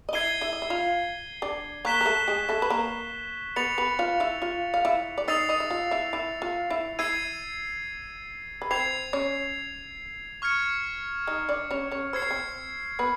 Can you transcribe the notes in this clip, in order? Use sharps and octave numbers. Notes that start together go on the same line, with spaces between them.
D#5
E4 E5 G#6 C7 D#7 G7
E4 E5
D#5
E5
F4 F5
D4 D5
A#3 A#4 C#6 F#6 B6 E7 G7
A#4
A3 A4
G#3 G#4
A3 A4
B4
A#3 A#4
B3 B4 A6 C#7 F7
B3 B4
F4 F5
E4 E5
F4 F5
F5
E4 E5
D5
D#4 D#5 E6 A6 C7 F7
D#4 D#5
E5
F4 F5
E4 E5
E4 E5
F4 F5
E4 E5
E4 E5 E6 G#6 C7 D#7
B4
C4 C5 G#6 C7 F7
C#4 C#5
C#6 F6 G#6 C#7
D#4 D#5
D4 D5
C#4 C#5
C#4 C#5
C5 E6 G#6 C7
C#5
C4 C5
B3 B4